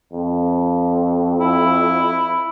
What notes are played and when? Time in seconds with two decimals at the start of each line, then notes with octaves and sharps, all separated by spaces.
0.13 F2
1.40 E4